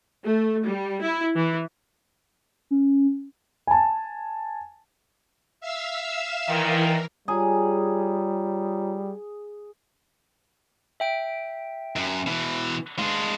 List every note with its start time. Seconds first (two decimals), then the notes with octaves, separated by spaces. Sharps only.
0.24 A3
0.66 G3
1.02 E4
1.36 E3
2.71 C#4
3.67 G#5 A5
5.60 E5 F5 E6
6.47 A#2 D#3 E3 A#4
7.28 G3 F4 G#4 C#5 A#5
11.00 E5 G5 D7
11.96 F#2
12.27 B2 E3
12.99 G#3 D4 F5